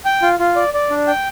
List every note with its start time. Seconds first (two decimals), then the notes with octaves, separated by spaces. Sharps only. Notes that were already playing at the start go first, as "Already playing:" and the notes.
0.05 G5
0.22 F4
0.39 F4
0.56 D5
0.74 D5
0.90 D4
1.07 G5